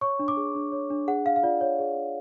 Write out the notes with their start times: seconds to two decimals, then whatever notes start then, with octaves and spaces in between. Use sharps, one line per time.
0.01 C#5 C#6
0.19 D4
0.28 D6
0.37 G#4
0.55 D4
0.72 C#5
0.90 D4
1.07 G#4 F#5
1.25 D4 F5
1.36 F5
1.43 F4 D5
1.61 C#5
1.79 G#4
1.96 D4